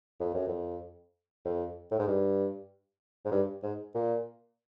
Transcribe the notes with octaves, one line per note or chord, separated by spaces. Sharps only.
F2
F#2
F2
F2
A2
G#2
G2
G#2
G2
G#2
A#2